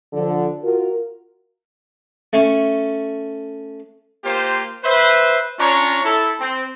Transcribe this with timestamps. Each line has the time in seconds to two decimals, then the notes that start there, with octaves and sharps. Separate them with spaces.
0.13 D3 F3
0.62 F4 F#4 A#4
2.33 A3 C#4
4.24 A#3 F4 G4 C5
4.84 B4 C5 E5
5.59 C#4 D4 F4 C#5 A#5 C#6
6.04 E4 A4
6.40 C4